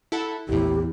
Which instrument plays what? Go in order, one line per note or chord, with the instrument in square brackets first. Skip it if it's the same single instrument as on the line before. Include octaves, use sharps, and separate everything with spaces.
[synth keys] E4 A4 F#5
[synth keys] A#1 A2 [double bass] E2 [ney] E4 [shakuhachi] G4